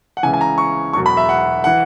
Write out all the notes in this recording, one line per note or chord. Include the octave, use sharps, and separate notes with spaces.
F#5
C#2 C#3 E3 G#5
G#5
A#5
C#6
E1 E2 B2 F#3 C#6
B5
E5
F#5
E3 F#5